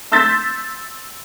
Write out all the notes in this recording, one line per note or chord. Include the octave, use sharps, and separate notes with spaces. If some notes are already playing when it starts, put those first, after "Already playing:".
C6 E6 G6 A6 B6